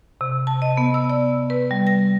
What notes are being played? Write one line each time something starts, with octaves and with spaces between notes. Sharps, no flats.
C3
A5
D#5
B3
E6
D5
B4
G3
A#6